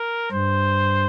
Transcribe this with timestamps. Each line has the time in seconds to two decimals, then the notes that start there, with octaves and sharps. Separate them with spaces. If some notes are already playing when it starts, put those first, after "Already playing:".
Already playing: A#4
0.31 G2 C5